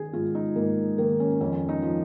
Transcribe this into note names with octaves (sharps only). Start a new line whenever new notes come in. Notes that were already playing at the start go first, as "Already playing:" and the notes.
Already playing: D#3 G#4
G#2 F4
D#4
G#2 A#3
D#3 A#3
C#4
F2 C#4
D#4
F3